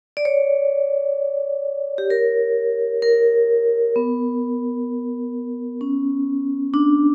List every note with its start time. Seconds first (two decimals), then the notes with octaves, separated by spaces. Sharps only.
0.17 D5
0.25 C#5
1.98 G4
2.10 A#4
3.02 A#4
3.96 B3
5.81 C#4
6.74 D4